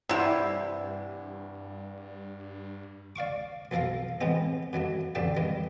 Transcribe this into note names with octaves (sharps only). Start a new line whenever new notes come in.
G2 C3 E3 E4 C5 D5 F#5
D5 F5 C#6 D6
B1 F3 A4 A#4 F5
A2 E3 G#3 B3 C4 D#4
F#2 D#3 F#3 A3
A1 F2 D3 D5 E5 G5
G2 D#3 G3